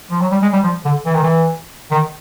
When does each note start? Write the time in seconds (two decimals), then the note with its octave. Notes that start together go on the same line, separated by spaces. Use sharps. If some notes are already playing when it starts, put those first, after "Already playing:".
0.11 F3
0.21 F#3
0.32 G3
0.42 G#3
0.53 G3
0.64 F3
0.85 D3
1.06 E3
1.15 D#3
1.23 E3
1.91 D#3